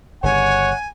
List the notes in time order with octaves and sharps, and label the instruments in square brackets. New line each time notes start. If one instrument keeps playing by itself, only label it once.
[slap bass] G1 C#3 [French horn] C#5 [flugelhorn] F#5 [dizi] G#5